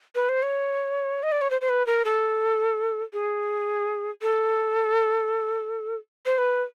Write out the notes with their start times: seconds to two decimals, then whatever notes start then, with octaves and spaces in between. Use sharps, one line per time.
0.15 B4
0.29 C5
0.42 C#5
1.23 D#5
1.32 D5
1.41 C#5
1.51 C5
1.61 C5
1.69 B4
1.86 A#4
2.05 A4
3.13 G#4
4.22 A4
6.26 C5
6.38 B4